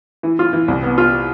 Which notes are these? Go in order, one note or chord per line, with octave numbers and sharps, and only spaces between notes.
E3
F4
E3
C2
B3
F4